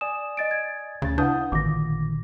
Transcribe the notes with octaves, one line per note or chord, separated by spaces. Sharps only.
D5 G#5 D#6 E7
D#5 A6 D7
G#6
D2 C#3 C#4 A6
D4 E4 B4 F5 F#5 D#6 G6
A1 A#2 D3 D#3 D6 A#6